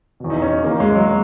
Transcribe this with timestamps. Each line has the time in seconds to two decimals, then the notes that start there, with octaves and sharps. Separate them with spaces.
0.20 E2 B2
0.30 D#4
0.42 C#4
0.64 E2 C#3 E3 A#3
0.80 G#3
0.95 F#3